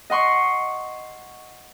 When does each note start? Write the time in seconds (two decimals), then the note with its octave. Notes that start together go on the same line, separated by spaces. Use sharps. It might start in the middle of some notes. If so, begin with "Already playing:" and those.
0.10 D#5 F#5 C6 C#6